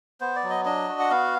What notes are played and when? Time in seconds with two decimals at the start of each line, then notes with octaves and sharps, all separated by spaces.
0.20 B3 C5
0.36 D5
0.43 F#3
0.50 D#5
0.65 D4 D#5
0.88 F#4
0.99 F#5
1.10 B3 F5